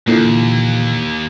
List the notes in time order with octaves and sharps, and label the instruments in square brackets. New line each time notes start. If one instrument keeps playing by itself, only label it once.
[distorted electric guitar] D#2 [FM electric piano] A#2 D3 E3